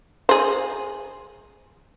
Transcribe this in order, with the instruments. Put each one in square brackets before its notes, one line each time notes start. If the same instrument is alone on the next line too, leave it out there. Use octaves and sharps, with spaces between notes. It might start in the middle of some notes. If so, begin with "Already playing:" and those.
[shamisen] G#4 C5